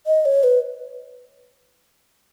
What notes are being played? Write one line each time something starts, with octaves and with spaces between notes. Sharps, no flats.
D#5
C#5
B4